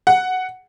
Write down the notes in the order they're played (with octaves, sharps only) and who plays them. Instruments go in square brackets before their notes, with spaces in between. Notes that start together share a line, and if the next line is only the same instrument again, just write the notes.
[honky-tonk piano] F#5